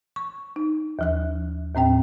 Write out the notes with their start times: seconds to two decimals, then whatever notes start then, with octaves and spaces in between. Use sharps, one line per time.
0.16 C#6
0.56 D#4
0.99 D#2 F3 F#6
1.75 D#2 A2 C4 G5